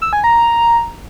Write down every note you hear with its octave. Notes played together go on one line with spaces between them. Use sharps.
E6
G#5
A#5